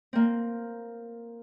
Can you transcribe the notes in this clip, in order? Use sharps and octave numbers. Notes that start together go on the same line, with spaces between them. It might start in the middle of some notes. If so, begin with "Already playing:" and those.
A#3 C4